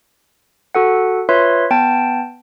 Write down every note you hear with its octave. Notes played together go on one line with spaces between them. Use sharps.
F#4 A4 F#5
F4 B4 C#5 E5 C6
B3 G5 A5